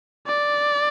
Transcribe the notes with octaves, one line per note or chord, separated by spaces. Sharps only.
D5